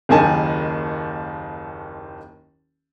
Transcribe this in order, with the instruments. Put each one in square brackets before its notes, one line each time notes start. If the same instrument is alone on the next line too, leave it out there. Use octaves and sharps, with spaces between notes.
[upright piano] F#1 D#2 D#3 G#5 A5